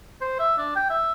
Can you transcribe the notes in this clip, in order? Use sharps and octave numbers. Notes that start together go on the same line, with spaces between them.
C5
E5
D4
G5
E5